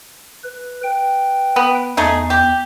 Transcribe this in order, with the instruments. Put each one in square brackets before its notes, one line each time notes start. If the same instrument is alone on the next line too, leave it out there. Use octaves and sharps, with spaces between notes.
[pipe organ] B4
B4 G5
[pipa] B3
[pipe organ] E2 [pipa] A3 D#4 G#4
[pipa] G4